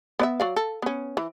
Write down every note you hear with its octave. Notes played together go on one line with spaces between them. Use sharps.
B3 D5 E5
F#3 D5 F5
A4
B3 C#4
E3